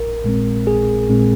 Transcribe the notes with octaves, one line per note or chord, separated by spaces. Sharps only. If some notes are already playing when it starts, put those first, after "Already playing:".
Already playing: A#1 A#4
A#2 G#3 C4
A#1 G#4
A#2 G#3 C4